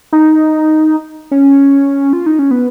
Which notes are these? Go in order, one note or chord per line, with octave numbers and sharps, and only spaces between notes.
D#4
C#4
F4
D#4
C#4
B3